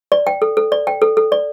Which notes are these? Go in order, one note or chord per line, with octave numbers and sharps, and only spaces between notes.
D5
G5
A4
A4
D5
G5
A4
A4
D5